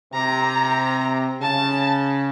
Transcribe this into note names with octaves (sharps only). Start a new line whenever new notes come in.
C3 A#5
C#3 A5